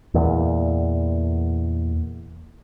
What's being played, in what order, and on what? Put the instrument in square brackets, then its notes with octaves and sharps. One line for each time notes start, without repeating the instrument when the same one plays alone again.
[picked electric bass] E2 A#2